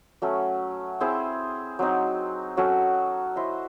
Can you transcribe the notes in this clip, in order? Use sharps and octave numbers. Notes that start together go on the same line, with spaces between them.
F#3 A3 C#4
C4 E4 G#4 C5
F#3 C4 D#4
F#3 C#4 F#4 A4
E4 C5 D#5